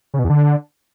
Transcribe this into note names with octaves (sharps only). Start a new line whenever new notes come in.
C#3
B2
E2
D3